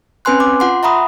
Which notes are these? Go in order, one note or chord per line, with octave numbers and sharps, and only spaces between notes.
C4 C#4 B4 G#5 C6 F#6
D6
F4 F#5 C6
E5 F#5 A#5 B5 D#6